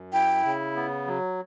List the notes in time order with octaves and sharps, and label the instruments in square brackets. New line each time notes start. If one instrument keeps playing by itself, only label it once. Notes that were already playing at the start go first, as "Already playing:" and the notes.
Already playing: [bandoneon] F#2
[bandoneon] E4 [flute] G5
[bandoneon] C#3
B3
F#3